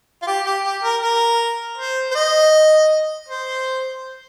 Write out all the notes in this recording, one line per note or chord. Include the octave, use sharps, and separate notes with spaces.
F4
G4
G4
G4
A#4
A#4
C5
C5
D#5
C5